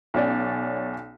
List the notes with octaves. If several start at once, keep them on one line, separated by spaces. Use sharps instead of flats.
B1 C#4 D5